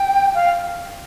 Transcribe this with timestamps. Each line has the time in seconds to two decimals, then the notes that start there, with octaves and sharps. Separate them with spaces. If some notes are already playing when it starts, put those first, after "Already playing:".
Already playing: G5
0.35 F5